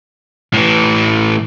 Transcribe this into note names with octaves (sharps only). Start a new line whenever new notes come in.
A2 E3